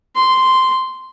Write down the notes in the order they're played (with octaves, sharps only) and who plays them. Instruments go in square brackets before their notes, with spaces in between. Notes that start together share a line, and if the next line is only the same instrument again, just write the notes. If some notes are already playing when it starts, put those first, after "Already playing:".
[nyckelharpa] C6